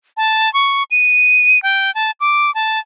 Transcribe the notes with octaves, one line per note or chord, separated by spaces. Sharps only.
A5
C#6
D#7
G5
A5
D6
A5